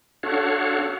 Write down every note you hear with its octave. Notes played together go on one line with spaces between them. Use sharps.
D4 F#4 A4 C#5 F5 F#5